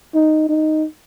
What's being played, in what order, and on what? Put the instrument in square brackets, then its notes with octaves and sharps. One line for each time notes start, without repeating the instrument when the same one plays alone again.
[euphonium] D#4
D#4